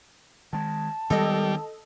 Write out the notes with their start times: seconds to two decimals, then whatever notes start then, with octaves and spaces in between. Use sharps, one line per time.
0.53 D#3 G#3 A5
1.10 D#3 G3 G#3 B3 A4 D#5